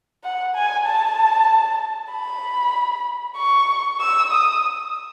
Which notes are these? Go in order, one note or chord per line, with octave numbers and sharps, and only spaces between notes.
F#5
G#5
A5
B5
C#6
E6
D#6